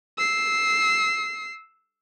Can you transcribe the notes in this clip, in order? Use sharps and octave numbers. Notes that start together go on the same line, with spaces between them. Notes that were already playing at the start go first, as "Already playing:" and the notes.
E6 C7